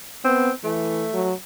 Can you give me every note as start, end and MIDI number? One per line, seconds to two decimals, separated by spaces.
0.25 0.50 59
0.25 0.52 60
0.64 1.07 52
0.64 1.32 57
1.14 1.33 54